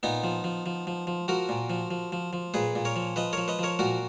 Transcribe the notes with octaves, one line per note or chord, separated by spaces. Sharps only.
A#2 B3 D#4
F3
F3
F3
F3
F3
F3 F#4 A#4
A#2
F3
F3
F3
F3
A#2 G#4 B4
A#2
A#4 C#5
F3
F3 B4 D#5
F3 A#4 C#5
B4 D#5
F3 A#4 C#5
A#2 F#4 A#4